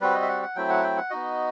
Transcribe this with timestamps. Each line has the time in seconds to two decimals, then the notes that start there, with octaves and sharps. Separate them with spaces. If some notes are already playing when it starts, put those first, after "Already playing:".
0.01 G3 C4 F#4 B4
0.14 D#5
0.22 E5
0.28 F#5
0.42 F#5
0.56 F#3 A3 C4 E4 G5
0.70 F#5
0.83 G5
0.97 F#5
1.10 B3 D#4 F#4 D#5